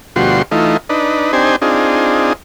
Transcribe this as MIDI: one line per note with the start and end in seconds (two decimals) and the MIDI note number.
0.16 0.42 38
0.16 0.42 47
0.16 0.42 53
0.16 0.42 55
0.16 0.42 66
0.16 0.42 84
0.51 0.77 52
0.51 0.77 57
0.51 0.77 63
0.51 0.77 65
0.89 1.33 62
0.89 1.33 63
0.89 1.33 71
1.33 1.56 60
1.33 1.56 62
1.33 1.56 63
1.33 1.56 67
1.33 1.56 72
1.33 1.56 80
1.62 2.33 60
1.62 2.33 62
1.62 2.33 63
1.62 2.33 65
1.62 2.33 68